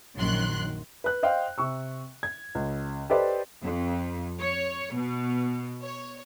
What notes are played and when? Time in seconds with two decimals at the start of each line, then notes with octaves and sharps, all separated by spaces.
0.16 A#1 F#2 D#3 C6 F#6
1.04 B4 F#6
1.23 C5 D#5 F5 G5
1.58 C3 C#6 E6
2.23 G#6
2.55 C#2
3.10 G4 A4 B4 C5 D5 D#5
3.61 F2
4.39 C#5
4.95 B2
5.82 C#5